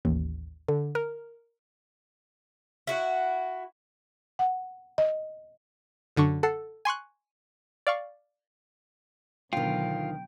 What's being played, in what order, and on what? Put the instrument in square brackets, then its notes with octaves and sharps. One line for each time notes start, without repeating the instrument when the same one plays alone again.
[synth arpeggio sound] A1 D#2
D3
A#4
[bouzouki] E4 F#4
[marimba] F#5
D#5
[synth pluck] F#2 D3 D4 C#6
A4 F#5 C7
G#5 C6 C#6 F#6
D5 F5 C#6
[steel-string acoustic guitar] D2 D#3 [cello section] B2 D3 F#3 [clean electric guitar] F4 [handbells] G5